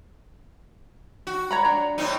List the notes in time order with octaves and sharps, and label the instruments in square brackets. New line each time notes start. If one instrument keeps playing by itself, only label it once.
[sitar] F#4
[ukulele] C#5 A#5 B5
D4 A#5
[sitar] A2 C4 D#4